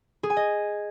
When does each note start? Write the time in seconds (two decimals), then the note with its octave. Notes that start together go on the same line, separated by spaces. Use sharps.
0.23 G#4
0.30 G#5
0.37 D#5